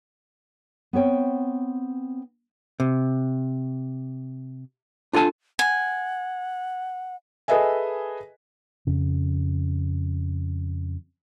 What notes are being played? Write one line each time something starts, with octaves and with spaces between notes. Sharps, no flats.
B3 C4 C#5 G5
C3
D4 F4 A4 G#5 A5
F#5 G#5
G#4 A4 B4 D#5 E5 G#5
F2 C#3